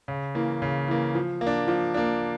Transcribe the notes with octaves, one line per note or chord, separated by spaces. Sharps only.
C#3
E3 A#3
C#3
E3 A#3
F3
A#3
D4
F3
A#3 D4